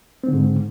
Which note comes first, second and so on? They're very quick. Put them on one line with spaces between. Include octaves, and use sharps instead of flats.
C4 D3 G#2